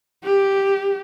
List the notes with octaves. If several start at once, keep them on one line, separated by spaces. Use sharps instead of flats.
G4